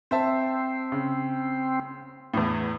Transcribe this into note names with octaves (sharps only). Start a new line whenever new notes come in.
C4 C5 E5 A5
C#3
E2 A2